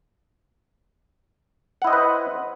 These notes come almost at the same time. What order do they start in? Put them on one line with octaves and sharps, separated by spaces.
F#5 E4 D#5 C5 B4